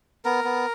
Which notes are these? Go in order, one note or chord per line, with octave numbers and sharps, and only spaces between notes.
B3 A#4
B3